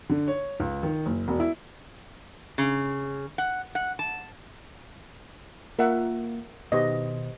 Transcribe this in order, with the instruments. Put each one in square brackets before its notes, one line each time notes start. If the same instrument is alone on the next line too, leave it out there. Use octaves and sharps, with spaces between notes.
[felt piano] D3
C#5
C#2
D#3
F#1
E1
E4
[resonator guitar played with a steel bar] C#3
F#5
F#5
A5
[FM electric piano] A#3 F4 [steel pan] A#4 E5 F#5
[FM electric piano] B2 D#3 C5 [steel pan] G4 B4 D#5